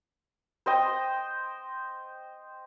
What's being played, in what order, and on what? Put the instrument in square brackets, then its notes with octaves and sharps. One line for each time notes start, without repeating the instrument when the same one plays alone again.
[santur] C5 D#5 G5